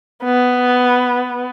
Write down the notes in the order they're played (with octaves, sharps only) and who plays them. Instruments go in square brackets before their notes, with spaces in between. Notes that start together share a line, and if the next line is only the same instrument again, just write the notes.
[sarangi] B3